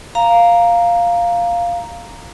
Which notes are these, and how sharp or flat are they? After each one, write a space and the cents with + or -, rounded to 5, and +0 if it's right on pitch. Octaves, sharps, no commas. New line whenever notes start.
F5 +0 A#5 +0